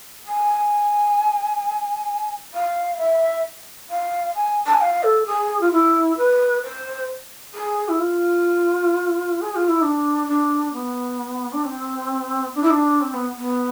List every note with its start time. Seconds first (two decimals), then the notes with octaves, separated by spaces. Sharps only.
0.25 G#5
2.54 F5
2.98 E5
3.90 F5
4.35 G#5
4.66 A5
4.74 G#5
4.81 F5
5.03 A4
5.26 G#4
5.61 F4
5.72 E4
6.18 B4
6.63 C5
7.54 G#4
7.89 E4
8.00 F4
9.41 G#4
9.55 F4
9.68 E4
9.82 D4
10.27 D4
10.73 B3
11.52 D4
11.64 C4
12.55 D4
12.63 E4
12.70 D4
13.00 C4
13.13 B3
13.36 B3